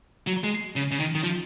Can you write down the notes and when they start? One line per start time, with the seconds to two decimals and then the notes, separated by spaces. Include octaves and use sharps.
0.27 F#3
0.44 G#3
0.76 C#3
0.91 C#3
1.00 D#3
1.15 D#3
1.24 F3